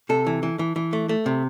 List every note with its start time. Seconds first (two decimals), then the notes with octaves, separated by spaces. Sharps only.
0.09 C3 A4
0.27 E3
0.43 E3
0.59 E3
0.76 E3
0.93 A3
1.09 A3
1.26 C3